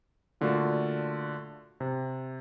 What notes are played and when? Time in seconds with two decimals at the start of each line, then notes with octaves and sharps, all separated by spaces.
0.41 A#2 D3 A3 D4 F4 F#4
1.80 C3